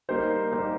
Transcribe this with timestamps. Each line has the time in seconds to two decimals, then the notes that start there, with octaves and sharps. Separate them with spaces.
0.09 G3 A#3 D#4 G4 C5
0.52 G3 A#3 D#4 G4 C5